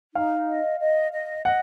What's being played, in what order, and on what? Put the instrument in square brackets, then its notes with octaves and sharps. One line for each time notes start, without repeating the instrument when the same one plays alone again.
[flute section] D#4 [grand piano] F5
[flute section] D#5
D#5
D#5
[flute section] D#5 [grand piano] F#5